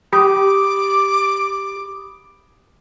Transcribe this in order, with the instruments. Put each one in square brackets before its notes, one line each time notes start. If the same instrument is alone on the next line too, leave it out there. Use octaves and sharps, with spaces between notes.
[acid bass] G4 [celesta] B5 D#6 [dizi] D6